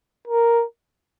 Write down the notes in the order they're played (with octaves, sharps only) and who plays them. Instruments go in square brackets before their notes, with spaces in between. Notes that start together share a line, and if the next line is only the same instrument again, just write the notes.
[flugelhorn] A#4